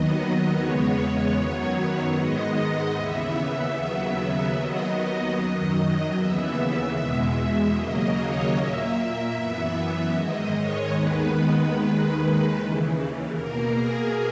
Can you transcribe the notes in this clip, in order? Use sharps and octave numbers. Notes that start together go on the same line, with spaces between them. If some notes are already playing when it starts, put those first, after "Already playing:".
Already playing: D#2 D#3 F#3 B3 D#5
E2 C#3 G#3 B3 C#5
F#2 D#3 F#3 B3
G#2 D#3 G#3 B3 D#5
D#2 C#3 E3 B3 E5
D#2 C#3 F#3 B3
D#2 D#3 F#3 B3 D#5
F#2 D#3 F#3
D#2 C#3 E3 B3 E5
E2 B2 G#3
D#2 C#3 F#3 A#3 D#5
C#5
A#2 A#3 E5
F#2 E3 B3
G#2 D#3 G#3 D#5
C#5
D#2 D#3 G#3 B3 B4
D#2 D#3 G#3
D#2 C#3 E3
B2 A#3 A#4
G#4